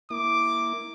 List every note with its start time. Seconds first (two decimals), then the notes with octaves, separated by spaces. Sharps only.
0.11 A#3 E4 D6